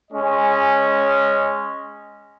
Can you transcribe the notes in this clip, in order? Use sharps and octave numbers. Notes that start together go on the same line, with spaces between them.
G#3 C#4 D#5 G#5